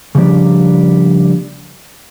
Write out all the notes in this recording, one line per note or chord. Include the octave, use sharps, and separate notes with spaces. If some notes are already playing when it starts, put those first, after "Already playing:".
C#3 F3 G3 A#3 D4